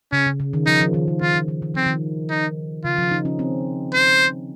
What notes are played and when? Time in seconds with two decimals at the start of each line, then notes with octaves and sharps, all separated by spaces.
0.12 C#3 C#4
0.27 C#3
0.40 C#3
0.53 D#3
0.67 F3 D#4
0.81 F3
0.94 D#3
1.08 C#3
1.22 D#3 F4
1.35 F3
1.48 D#3
1.62 D#3
1.74 F3 C4
1.86 D#3
2.30 D#4
2.85 C#3 F4
2.98 F3
3.11 D#4
3.25 C#4
3.39 C4
3.94 C5